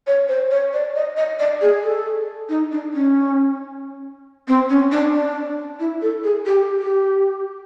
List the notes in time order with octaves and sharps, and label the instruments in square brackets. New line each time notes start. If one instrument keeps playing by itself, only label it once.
[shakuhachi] C#5
C5
C#5
D5
D#5
D#5
D5
G#4
A4
D#4
D4
C#4
C4
C#4
D4
D4
E4
A4
G#4
G4
G4